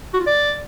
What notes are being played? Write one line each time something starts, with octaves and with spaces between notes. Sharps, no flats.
F#4
F4
D5